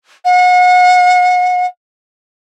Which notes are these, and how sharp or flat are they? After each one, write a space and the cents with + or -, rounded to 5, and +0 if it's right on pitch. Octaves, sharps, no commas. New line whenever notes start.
F#5 -35